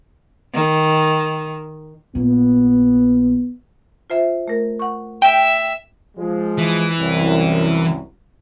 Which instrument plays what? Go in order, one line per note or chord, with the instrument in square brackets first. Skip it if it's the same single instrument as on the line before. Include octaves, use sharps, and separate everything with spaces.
[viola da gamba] D#3
[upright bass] A#1 A#3 [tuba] B3
[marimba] F4 C5 E5
A3 A#4
F#5 C#6
[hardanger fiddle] E5 [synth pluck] G5
[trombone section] F3 G#3
[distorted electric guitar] E3
[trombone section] C2 F#2